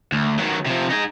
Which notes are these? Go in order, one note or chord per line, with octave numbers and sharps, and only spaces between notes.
D2
D#3 F#3
C3 F3
D#4 G#4